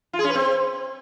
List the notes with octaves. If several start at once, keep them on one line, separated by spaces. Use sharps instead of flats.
F4
G#4
C#4
B4
C4